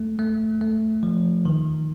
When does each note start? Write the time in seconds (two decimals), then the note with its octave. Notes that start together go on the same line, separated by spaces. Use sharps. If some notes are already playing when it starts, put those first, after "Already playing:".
Already playing: A3
0.19 A3
0.61 A3
1.03 F3
1.45 D#3